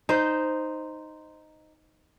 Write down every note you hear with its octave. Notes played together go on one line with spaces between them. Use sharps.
D#4 C5